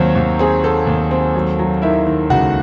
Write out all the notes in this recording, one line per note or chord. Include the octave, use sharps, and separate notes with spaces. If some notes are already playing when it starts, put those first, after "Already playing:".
Already playing: D#2 F#3 C4 C5 C#5
D#2
C4 G#4
C4 A4
D#2
C4
F#3
F#3
D#3 E4 E5
D#3
C#2 F#4 F#5